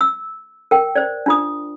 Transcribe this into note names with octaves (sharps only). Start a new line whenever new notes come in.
E6
A#4 G5
C5 D5
D4 F4 D#6